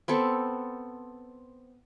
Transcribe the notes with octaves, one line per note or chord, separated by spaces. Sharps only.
B3 C4 A4